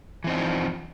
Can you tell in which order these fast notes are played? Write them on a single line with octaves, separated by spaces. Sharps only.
E3 C4 D#4 D4 F3